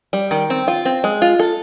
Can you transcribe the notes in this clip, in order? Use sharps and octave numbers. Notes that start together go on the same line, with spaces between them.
G3
D#3
C4
F4
C4
G#3
F4
A4